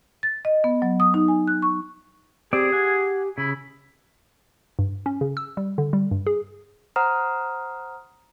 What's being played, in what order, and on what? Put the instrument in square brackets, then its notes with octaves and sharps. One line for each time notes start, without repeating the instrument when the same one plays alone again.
[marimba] A6
D#5
B3
F#3
D#6
D#4
G#5
F#6
C#6
[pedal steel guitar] C4 D5 [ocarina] G4 [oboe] G#4
[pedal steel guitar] F#5 G#5
[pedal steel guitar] C#3 [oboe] E4
[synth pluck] G2
C#4
C#3
E6
G3
D3
G3
G2
G#4
[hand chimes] C5 F#5 A#5 D#6 F6